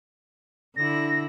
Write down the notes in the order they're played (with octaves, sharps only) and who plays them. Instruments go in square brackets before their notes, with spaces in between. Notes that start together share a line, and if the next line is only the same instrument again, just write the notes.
[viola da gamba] D3 E4 [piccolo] A#6